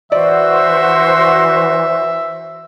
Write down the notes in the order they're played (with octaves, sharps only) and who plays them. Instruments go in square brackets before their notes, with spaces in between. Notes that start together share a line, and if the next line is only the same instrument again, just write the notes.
[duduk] E3 [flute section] F#4 C5 [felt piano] D5 [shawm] E5